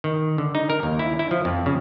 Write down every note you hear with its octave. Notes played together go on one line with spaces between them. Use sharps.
D#3
D3
D#4
A#4
D#2
E4
E4
F3
F2
C#3